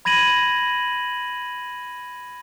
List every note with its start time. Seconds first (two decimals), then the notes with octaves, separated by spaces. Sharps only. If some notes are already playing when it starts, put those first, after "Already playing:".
0.05 B5 G#6 A#6 D#7 F#7